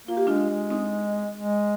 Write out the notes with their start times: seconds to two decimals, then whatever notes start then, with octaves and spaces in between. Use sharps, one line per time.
0.07 A#3 F4
0.17 G4
0.27 G#3 D4 F4
0.50 G#3
0.70 C4 D#4
1.34 G#3